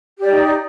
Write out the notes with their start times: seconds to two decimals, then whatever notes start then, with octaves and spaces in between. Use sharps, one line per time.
0.18 G4
0.23 D5
0.28 D#4